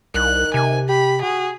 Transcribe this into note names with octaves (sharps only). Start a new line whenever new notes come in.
C2 D#3 F#6
C3 G#5
G4 B5
F#4 G#4